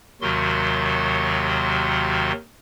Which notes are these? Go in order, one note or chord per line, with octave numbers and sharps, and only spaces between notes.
D#2 C3 D#3 F#3 F#4 C6